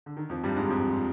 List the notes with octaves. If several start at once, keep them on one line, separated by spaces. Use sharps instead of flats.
D3
D#3
F2 F3
G2 G3
G#2 G#3
F2 F3
F3